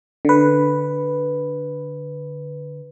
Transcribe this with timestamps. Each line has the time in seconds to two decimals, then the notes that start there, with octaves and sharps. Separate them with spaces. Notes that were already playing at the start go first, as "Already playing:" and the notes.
0.25 D3 B4